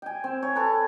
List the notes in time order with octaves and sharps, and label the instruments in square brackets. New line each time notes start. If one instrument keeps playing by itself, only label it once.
[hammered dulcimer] G5 G#5
C4
C#5
A4 B4